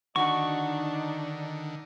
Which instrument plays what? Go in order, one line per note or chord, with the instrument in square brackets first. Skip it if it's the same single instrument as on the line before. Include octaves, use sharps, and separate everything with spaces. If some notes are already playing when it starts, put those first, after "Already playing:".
[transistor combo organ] D3 D#3 [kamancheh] D4 D#4 [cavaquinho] F#4 B4 [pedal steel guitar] C#6